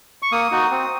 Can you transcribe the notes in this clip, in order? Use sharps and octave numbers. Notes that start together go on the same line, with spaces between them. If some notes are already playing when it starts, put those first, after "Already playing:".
C#6
A#3 D#6
D#4 F#4
C4